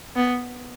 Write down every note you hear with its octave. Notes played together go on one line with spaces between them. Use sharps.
B3